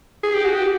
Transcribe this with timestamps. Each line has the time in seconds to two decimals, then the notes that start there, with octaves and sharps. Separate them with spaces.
0.23 G#4
0.34 G4
0.45 F#4
0.56 G4